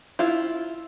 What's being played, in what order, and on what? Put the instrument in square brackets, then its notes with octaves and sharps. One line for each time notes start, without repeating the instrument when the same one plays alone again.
[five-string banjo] E4 F4